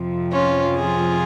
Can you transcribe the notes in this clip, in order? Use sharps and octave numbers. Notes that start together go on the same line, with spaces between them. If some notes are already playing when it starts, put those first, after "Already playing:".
Already playing: F2 C3 F3
C#4 F4
F4 G#4